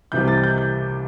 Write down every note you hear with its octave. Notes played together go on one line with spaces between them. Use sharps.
C2 C3 E3 G3 G6
A6
A6
G6
G6